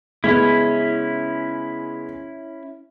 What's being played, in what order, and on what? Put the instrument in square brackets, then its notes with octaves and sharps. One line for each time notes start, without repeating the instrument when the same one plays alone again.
[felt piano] C#3 G#3 B3 [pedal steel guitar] C#4 E4